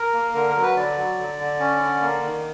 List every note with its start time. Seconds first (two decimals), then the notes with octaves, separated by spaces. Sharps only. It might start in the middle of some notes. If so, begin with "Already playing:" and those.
Already playing: A#4
0.14 A#3
0.35 D3 A#4
0.49 A#4
0.56 F#3
0.63 B4
0.76 D3 D5
0.97 F#3
1.18 D3
1.39 D3
1.60 C#4
1.81 D3
2.01 A#3
2.23 D#3